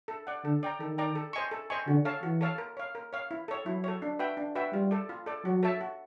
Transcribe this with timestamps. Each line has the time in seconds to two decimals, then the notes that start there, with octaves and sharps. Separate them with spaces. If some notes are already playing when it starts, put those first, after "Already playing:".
0.08 A4
0.27 D5 F#5
0.44 D3 A4
0.63 D5 G5 A#5
0.80 D#3 A4
0.98 D5 G5 A#5
1.15 A4
1.33 C5 D#5 G#5 C#6
1.51 A4
1.70 C5 D#5 G#5 C#6
1.87 D3 F#4
2.05 A4 C#5 F5 A5
2.23 E3 F#4
2.41 A4 C#5 F5 A5
2.58 A#4
2.77 C#5 F5
2.95 A#4
3.13 C#5 F5
3.31 E4
3.48 A4 C#5
3.66 F#3 E4
3.84 A4 C#5
4.02 D4
4.19 F#4 B4 E5 G5
4.37 D4
4.55 F#4 B4 E5 G5
4.73 G3 F4
4.91 A4 D5
5.09 F4
5.26 A4 D5
5.44 F#3 F#4
5.63 A4 C#5 E5 A5
5.81 F#4